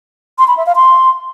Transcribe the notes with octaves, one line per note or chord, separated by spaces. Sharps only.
C6
B5
E5
F5
C6